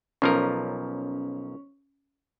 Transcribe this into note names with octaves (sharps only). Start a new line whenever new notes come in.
B1 F3 C#4 A#4